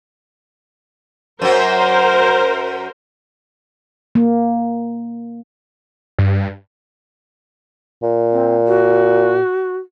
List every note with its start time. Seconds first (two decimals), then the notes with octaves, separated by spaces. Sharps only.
1.42 F#2 F#3 A#4 C5
4.15 A#3
6.19 G2
8.03 A#2
8.32 C4
8.67 F#4